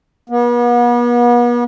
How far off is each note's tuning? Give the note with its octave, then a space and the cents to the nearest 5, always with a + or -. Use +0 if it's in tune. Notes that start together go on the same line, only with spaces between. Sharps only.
B3 -40